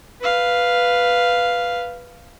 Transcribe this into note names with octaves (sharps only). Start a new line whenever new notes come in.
B4 F5